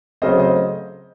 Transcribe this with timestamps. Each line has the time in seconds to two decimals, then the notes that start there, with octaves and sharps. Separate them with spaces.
0.22 C#3 F#3 A3 C4 C5 D#5
0.39 C5 D#5